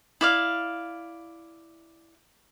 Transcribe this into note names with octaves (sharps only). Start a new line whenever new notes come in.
E4 D5 F5